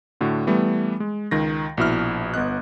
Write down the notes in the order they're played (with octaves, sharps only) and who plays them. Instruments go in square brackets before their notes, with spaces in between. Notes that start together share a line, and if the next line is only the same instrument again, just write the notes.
[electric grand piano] A2 D3 F#4
E3 G3 A3 B3
G#3
C#2 D#3 A#6
A#1 B2 E4 F6
G1 B3 D#5 F#6